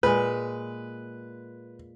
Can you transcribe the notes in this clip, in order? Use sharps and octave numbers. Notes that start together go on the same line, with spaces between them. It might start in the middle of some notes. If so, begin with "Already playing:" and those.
A#2 G#3 B4